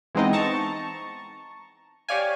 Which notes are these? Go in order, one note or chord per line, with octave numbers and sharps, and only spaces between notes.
E3 G#3 B3 C4 D#4 D#5
A5 A#5 C#6
G4 C#5 D5 F5 G#5